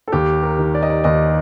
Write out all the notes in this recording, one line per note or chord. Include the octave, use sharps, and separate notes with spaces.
A4
D#2 G4
A#4
D#3
D5
D#5
D5
D#2 D#5